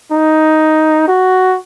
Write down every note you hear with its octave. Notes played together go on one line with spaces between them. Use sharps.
D#4
F#4